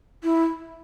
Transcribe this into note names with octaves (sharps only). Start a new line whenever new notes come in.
E4